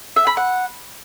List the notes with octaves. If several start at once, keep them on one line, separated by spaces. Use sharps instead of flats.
E5
B5
F#5